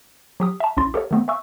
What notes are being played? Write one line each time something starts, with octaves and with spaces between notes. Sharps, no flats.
F#3 G4 D#6
E5 A5
A#1 D#2 C#4 E4 C6 A6
G4 A4 A#4 C#5
D#3 E3 A3 B3 C4
E5 F5 G#5 C#6 E6